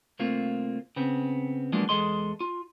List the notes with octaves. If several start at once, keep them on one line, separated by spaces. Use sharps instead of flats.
C2 A3 A#3 C4 F4
C#3 B3 C4
F3 F#3 G#3 A#3 B3 D4
E2 G#3 A4 D#5 C6
F4